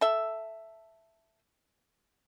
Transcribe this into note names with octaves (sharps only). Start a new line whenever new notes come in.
A4 E5